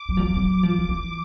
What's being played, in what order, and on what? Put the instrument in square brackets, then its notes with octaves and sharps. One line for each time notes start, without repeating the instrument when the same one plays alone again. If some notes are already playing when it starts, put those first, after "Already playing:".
Already playing: [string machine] D6
[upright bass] F#3
F3
F#3
F#3
F3
F3
E3